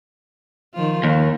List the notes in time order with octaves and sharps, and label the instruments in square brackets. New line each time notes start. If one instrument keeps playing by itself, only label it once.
[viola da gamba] D#3 F3 F4
[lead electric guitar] D#2 [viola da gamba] D#3